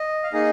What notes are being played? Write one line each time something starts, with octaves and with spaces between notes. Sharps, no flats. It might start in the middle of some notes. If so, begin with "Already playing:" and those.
Already playing: D#5
F5
A#3 D#4 G#4 D#5